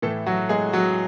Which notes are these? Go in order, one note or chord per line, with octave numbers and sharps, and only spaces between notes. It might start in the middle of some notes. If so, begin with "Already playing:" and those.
A2 E3 A3 A4
F#3 F#4
G#3 G#4
F#3 F#4